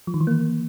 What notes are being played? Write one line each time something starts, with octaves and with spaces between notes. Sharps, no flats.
F3
D#3
E3
A#3